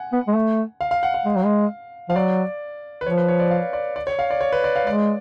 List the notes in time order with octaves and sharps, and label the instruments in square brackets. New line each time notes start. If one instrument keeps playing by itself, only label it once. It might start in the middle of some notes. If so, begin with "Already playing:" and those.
Already playing: [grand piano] F#5 G#5
[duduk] B3
G#3
A3
[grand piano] F5
F5
F#5
F5
[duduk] G#3
F#3
G#3
[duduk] F3 [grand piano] F5
[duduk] F#3 [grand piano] D5
[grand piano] B4
[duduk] F3 [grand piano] C#5
[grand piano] B4
C#5
D5
F5
D5
D5
C#5
F5
D5
C#5
B4
D5
F5
[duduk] G#3 [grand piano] D5